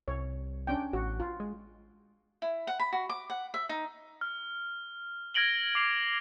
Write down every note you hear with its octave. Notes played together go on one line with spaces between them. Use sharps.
C2 C#5
C#4 D4 G5
A1 F#4
F4
G#3
E4
F#5
B5
F#4
D6
F#5
E5
D#4
F6
F6 G#6 A#6 D7 F#7 G7
D6 C7 F7